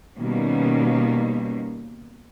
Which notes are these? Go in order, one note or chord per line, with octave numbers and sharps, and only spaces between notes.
B2 D#3 G3 A#3 B3 C#4